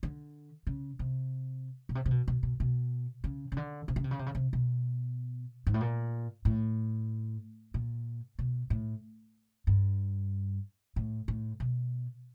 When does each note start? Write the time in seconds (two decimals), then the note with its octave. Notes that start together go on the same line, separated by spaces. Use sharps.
0.03 D3
0.67 C#3
0.99 C3
1.89 B2
1.95 C3
2.06 C3
2.11 B2
2.28 B2
2.43 B2
2.60 B2
3.24 C#3
3.52 C#3
3.57 D3
3.88 C3
3.96 C#3
4.04 C3
4.11 C#3
4.19 C3
4.26 C#3
4.35 C3
4.53 B2
5.67 G#2
5.74 A2
5.81 A#2
6.45 A2
7.74 A#2
8.39 B2
8.70 A2
9.67 G2
10.96 A2
11.28 A2
11.60 B2